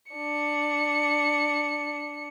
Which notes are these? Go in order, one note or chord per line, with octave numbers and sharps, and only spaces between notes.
D4 C#7